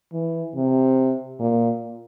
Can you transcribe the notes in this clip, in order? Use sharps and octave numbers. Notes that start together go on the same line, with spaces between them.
E3
C3
A#2